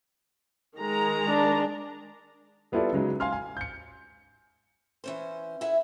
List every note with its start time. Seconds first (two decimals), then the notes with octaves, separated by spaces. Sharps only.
0.77 D#3 G#3 A#5
1.28 D4
2.72 G3 B3 E4 F4 A4 D5
2.92 C#3 F#3 G#3 D#4
3.20 F5 G#5 C6 F6
3.32 G#5
3.57 G6 C#7
5.04 E3 C#4 C5
5.61 E4 G#4 E5 F#5